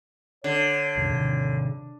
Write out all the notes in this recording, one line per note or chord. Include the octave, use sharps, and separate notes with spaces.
D3 C#5
B1 F2 C3
C3 D#3